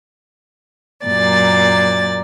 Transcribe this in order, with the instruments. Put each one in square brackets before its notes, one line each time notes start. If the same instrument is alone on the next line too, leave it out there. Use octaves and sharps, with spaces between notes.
[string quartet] F#2 A#2 D5 A6